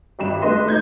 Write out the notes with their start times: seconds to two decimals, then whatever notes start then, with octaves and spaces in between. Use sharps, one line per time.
0.19 G#1 G2 E7
0.42 G#3 A3 D4 B4 D#5 C6
0.66 A3 D#4 G6 G#6